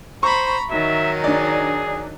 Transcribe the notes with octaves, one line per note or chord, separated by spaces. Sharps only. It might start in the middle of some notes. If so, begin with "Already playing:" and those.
C5 A#5 B5 C#6
D#3 F#3 D#4 E5
D4 G#4 D5